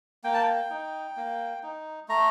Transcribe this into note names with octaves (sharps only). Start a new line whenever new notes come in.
A#3 G5
A5
G5
D#4
A#3
D#4
A3 A#5